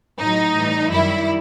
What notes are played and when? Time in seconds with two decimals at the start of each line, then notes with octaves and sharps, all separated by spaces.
0.19 A2 F#3 D#4
0.54 A2 E3 G3
0.90 F#2 D#3 G3 E4